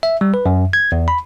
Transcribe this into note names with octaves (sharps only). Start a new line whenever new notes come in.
E5
G3
B4
F#2
G#6
E2
B5